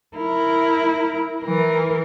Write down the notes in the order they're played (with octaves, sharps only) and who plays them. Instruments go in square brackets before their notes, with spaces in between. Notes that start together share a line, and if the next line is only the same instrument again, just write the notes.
[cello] E4 A#4
E3 A#4